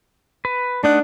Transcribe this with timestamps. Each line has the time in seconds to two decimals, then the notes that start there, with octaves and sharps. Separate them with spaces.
0.45 B4
0.84 A3 D4 D#4 F#5